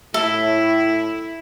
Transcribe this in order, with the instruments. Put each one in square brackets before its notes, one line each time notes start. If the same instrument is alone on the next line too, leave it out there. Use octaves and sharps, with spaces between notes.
[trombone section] A2 [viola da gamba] E4 [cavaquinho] A4 [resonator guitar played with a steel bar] E5